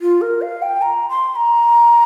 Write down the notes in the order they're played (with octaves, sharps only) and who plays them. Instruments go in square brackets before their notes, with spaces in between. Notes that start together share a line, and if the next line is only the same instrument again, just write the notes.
[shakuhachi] F4
A#4
F5
G5
A#5
C6
A#5